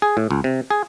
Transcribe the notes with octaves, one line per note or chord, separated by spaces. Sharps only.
G#4
A2
C#2
C3
G#4